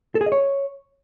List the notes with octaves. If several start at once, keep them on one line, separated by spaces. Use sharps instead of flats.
A4
G#4
D#5
C#5